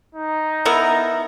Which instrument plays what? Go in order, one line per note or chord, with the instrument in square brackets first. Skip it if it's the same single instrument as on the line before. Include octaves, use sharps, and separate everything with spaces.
[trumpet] D#4
[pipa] B3 E4 A#4